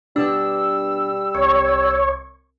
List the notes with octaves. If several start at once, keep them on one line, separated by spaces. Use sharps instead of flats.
B2 G3 D4 E6
C2 C#5